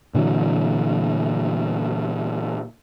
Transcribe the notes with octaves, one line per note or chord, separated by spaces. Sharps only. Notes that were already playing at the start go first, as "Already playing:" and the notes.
A#2 D3 E3 F#3